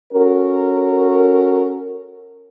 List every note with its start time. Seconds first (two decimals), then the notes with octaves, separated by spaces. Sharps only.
0.13 C#4 F#4 A4 A#4